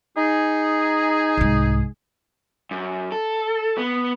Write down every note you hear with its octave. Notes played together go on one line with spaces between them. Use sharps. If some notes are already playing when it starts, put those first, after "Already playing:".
D#4 G#4
C2 G#2
F#2
A4
B3